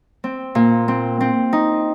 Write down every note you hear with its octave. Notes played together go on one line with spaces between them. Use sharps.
C4
A#2
C4
C4
D#4